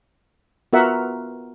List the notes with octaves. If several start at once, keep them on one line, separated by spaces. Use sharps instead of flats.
B3 F4 F#4 A#4 E5 F#5